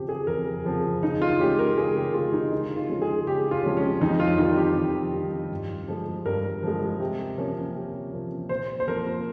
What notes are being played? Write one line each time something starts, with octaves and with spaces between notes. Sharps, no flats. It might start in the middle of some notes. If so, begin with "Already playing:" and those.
Already playing: F2 C#3 F3 C4 G4
G#4
F2 A#4
C#3 F3 C4
C#3 D#4
F4
G#3 C#4 G4
A#4
C#3 G#4
G4
G#3 C#4 F4
D#4
C#3 D#4
F4
F3 G#3 C#4
G#4
C#3 G4
F4
F3 G#3 C#4
C#4
F2 D#4
F4
D#3 G3 F4
G4
F2
D#3 G3
G2
F3 G#3
G2 A#4
F3 G#3
C3
F3 A#3 C#4
C3
F3 A#3 C#4
A#2 C5
C5
F3 A#3 A#4